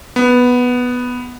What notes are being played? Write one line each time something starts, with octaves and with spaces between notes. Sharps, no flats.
B3